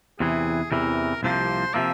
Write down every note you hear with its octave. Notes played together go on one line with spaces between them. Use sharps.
E2 C3 E3 G#4
E2 C3 E3 A#4
C2 C3 F3 A#3 C5
C3 F3 A#3 E5